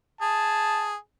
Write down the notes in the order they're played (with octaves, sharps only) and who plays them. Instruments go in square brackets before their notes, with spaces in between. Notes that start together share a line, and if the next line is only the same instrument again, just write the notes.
[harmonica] G#4 [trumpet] A5